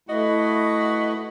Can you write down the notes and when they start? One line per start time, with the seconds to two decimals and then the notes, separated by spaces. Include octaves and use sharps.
0.09 A3 E4 F#4 B4 D#5